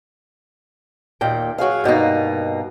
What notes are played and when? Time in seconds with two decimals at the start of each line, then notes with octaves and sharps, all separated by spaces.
1.21 D#2 A#2 G5
1.58 F#3 F#4 G#4 F5
1.84 G2 B2 A#3 D#4